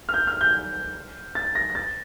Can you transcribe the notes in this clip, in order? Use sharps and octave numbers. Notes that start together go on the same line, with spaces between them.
F6
G6
F6
G6
A6
A#6
A#6
A6